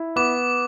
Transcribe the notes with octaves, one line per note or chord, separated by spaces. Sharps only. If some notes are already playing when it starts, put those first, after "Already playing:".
Already playing: E4
B3 D6